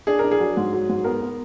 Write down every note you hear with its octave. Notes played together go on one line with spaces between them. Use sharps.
D4 G#4
D4 A#4
G#4
F#3
G#2
F#3
G#2
B3 A#4
B3